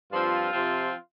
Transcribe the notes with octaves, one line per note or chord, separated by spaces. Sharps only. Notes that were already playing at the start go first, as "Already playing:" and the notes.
G2 F3 C4 F4
C3 F3 C4